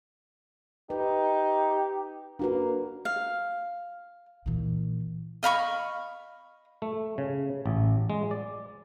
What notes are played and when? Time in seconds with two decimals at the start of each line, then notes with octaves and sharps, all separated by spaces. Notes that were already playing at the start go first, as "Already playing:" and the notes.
0.90 D#4 G4 B4
2.39 A#3 D4 F#4 B4
3.05 F5
4.46 A#2 E3
5.43 D#5 F5 B5 C#6
6.82 A3
7.18 C#3
7.66 A1
8.10 G#3
8.31 D5